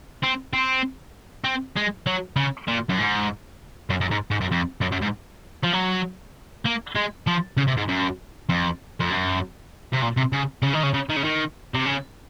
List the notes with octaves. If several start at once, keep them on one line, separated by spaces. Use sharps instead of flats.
C4
C4
C4
G#3
F#3
C#3
A#2
F#2
G#2
F#2
F#2
G#2
G#2
F#2
F2
F#2
F#2
G#2
F3
F#3
A#3
G#3
F3
C#3
C3
G#2
F#2
F2
F2
F#2
C3
A#2
C3
C#3
C#3
D#3
C#3
C#3
D#3
C#3
D#3
C3
C#3